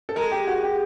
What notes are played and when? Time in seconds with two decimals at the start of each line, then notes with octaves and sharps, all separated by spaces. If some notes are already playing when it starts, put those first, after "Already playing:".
0.09 A4
0.16 G#3 A#4
0.31 G4
0.47 F#4
0.63 G4